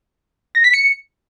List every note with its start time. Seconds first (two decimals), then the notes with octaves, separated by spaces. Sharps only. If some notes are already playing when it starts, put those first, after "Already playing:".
0.55 A#6
0.64 B6
0.74 C#7